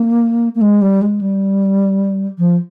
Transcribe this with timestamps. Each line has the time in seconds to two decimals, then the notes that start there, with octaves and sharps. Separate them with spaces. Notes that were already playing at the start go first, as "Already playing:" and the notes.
Already playing: A#3
0.55 A#3
0.61 G#3
0.82 G3
1.01 G#3
1.21 G3
2.39 F3